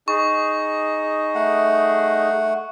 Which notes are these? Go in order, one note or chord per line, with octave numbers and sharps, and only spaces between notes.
D#4 G#4 C#6
A3 F#5